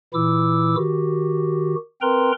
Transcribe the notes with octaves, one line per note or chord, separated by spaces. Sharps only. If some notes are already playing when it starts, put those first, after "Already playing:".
A#2 E3 E4 D6 E6
D#3 F#4 G4
C4 A#4 B4 G5 A#5 C6